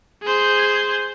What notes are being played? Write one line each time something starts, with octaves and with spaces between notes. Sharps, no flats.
G#4 C5